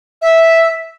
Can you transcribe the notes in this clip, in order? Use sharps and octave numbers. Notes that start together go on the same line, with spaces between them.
E5